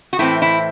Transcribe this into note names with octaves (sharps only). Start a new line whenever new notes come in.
F#4
A2 E3 C4 E4
E4